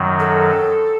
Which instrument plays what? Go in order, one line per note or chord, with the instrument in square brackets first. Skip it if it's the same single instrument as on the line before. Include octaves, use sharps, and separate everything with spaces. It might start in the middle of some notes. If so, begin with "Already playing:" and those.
Already playing: [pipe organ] F#2 D#3 F#3
[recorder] A4